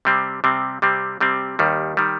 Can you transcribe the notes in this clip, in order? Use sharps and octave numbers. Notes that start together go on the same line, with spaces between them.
C3 G3 C4
C3 G3 C4
C3 G3 C4
C3 G3 C4
D#2 D#3 G3
D#3 G3